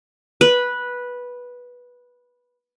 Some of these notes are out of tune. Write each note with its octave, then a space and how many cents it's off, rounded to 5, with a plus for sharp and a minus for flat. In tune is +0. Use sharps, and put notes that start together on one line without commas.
B4 -10